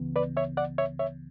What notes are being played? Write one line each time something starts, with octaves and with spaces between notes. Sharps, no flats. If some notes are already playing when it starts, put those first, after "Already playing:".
Already playing: C#2 C#3 E3 B3
B4 D5
C#5 E5
D5 F#5
C#5 E5
C#5 E5